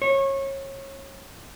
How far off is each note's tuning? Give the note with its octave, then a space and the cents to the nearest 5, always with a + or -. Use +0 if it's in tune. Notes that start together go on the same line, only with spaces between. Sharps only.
C#5 -25